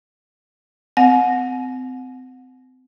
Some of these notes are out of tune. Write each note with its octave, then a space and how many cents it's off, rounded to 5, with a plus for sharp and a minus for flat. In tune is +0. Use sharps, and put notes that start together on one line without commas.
C4 -35 F#5 -25